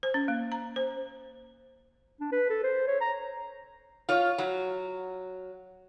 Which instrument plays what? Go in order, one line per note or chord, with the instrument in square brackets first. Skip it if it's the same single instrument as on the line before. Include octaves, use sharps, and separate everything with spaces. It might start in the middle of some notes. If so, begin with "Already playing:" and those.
[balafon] C5
C#4
A#3
A#5
C5
[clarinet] D4
B4
A4
C5
C#5
A#5
[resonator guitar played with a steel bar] F4 C#5
F#3